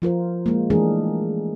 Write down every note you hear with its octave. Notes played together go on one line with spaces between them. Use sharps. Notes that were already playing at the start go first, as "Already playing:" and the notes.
F3 F4 A#4 C5
G#3 A#3
E3 G#3 A3 D4 G#4 A#4